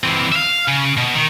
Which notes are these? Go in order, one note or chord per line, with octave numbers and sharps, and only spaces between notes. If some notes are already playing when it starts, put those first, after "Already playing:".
E3 C4
E5 F5
C#3
B2
D#3